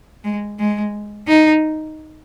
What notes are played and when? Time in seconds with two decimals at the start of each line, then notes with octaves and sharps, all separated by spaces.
0.24 G#3
0.59 G#3
1.28 D#4